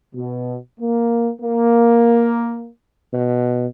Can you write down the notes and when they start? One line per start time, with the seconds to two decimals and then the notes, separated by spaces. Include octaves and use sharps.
0.15 B2
0.80 A#3
1.41 A#3
3.13 B2